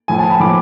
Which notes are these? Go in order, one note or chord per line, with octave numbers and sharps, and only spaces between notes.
A2 F3 G#5
A5
B5
A2 F3 D6